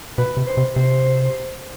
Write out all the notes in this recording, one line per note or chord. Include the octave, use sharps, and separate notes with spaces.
B2 B4
C3
C5
C3
C3 C5